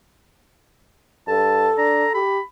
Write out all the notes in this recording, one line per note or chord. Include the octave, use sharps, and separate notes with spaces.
G2 A4 A5
D4 A#5
G4 B5